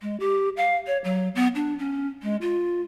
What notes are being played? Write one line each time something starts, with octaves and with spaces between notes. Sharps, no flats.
G#3
G4
F5
C#5
F#3
B3
D4
C#4
G#3
F4